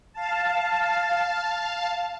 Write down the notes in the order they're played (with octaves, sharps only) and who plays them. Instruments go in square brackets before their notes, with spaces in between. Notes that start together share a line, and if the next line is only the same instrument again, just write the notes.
[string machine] F5 A5